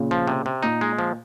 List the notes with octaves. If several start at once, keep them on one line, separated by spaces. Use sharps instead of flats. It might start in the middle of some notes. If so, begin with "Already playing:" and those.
Already playing: A#2 C#3
F3
C3
C3
A#2 D#4
G#3
F3